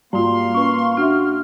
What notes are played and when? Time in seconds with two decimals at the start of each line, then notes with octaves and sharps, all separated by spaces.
0.13 G#2 G3 A#3 F4 F5 C6
0.55 C#4 B4 C#6
0.97 D4 F#4 E5 F6